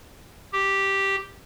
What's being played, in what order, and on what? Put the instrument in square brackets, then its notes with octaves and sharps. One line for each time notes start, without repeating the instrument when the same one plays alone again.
[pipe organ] G4